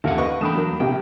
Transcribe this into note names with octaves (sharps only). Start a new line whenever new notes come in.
A1 D#2 A#3 A4 A#4 F5 F#5
B4 D#5 C#6
E2 A3 D4 G5 B5 D#6 E7
F#3 A#3
A#1 C3 G4 G5